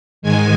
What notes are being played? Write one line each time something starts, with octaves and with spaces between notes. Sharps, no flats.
G#2 D#3 G#3 G#5